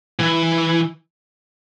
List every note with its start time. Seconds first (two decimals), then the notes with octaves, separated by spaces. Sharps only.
0.19 E3